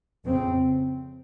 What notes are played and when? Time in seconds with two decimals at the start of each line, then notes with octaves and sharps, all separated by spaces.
0.25 F2 C#3 C4